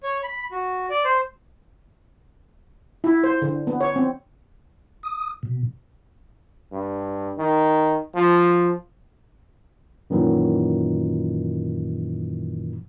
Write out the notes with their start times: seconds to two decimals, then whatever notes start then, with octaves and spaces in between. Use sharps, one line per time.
0.03 C#5
0.23 B5
0.52 F#4
0.90 D5
1.05 C5
3.04 E4
3.24 C5
3.42 D3
3.67 B3
3.81 C#5
3.96 C4
5.03 D#6
5.43 B2
6.72 G2
7.38 D#3
8.15 F3
10.10 F#2 A#2 D#3 E3 F#3